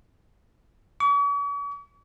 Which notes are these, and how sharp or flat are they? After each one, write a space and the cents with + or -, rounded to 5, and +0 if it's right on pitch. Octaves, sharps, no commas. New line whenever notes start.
C#6 +45